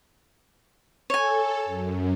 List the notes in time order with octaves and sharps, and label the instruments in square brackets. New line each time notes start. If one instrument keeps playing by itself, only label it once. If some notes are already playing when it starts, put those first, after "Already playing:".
[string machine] A4 [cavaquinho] C#5 G#5
[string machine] F#2